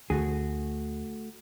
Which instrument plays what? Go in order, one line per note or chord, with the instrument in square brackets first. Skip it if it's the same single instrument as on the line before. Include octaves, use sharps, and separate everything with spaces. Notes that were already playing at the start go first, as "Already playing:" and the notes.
[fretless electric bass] D2 [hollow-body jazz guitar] A3 F#4 G#4